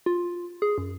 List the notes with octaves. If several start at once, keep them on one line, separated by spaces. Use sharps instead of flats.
F4
G#4
F#2